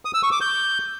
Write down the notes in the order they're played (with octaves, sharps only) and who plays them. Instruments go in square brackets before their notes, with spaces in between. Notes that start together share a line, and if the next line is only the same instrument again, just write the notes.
[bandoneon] D#6
E6
C#6
D6
G6